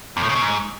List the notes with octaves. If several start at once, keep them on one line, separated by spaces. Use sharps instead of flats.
E2
A2
C#3
B2
G#2